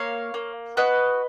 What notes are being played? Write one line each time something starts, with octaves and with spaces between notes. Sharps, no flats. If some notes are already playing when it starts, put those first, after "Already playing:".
Already playing: A#3 C#5 F5
A#3
F#4 B4 D#5